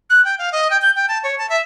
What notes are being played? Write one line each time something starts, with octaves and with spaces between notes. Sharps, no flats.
F#6
G5
F5
D#5
G5
G6
G5
A5
C#5
A5
E5